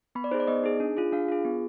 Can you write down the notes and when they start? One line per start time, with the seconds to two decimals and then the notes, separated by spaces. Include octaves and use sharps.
0.15 B3 B5
0.24 D5
0.31 D#4 G#4 C5
0.40 D5
0.47 B3 D#5
0.64 D#4 G#4
0.80 D4
0.97 F4 G#4
1.12 D4 F5
1.28 F4 G#4
1.45 B3